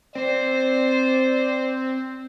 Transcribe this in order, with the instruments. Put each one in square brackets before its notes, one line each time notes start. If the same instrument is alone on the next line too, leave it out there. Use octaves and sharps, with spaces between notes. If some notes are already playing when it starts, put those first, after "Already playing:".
[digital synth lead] C4 [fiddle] C5 [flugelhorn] D5